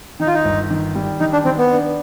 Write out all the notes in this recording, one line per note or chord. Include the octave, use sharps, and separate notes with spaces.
D#3 D#4
F4
D#4
G1
D#3
G3
D#3 D#4
D4
D#3 C4
B3
D4